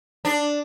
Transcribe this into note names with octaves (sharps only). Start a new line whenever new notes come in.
D4